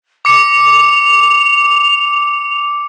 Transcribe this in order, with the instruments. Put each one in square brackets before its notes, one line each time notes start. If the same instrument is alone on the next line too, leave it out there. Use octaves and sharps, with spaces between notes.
[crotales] D6 C#7 [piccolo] F7